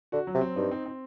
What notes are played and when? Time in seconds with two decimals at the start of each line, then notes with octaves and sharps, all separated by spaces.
0.12 D3 F#4
0.27 F#3
0.35 C3
0.41 C4
0.56 G2 D#4
0.71 C4
0.86 C4